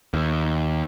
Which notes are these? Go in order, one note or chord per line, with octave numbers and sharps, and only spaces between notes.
D#2